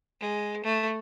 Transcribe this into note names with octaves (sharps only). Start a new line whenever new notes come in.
G#3
A3